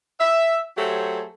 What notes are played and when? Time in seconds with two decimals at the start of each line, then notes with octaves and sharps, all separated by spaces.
0.20 E5
0.78 F#3 A3 G4 G#4 C5 C#5